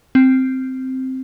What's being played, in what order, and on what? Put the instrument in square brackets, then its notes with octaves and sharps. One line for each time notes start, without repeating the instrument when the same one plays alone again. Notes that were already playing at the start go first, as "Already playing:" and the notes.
[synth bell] C4